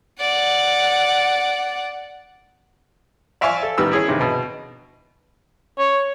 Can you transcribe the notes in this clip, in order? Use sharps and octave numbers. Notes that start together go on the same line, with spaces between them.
D5 F#5
D5 E5 F5 G#5 C#6 E6
A4
A1 D#3 G3 B3 E6
E4 G#4 C#5
G2 C3 D#3
B2
C#5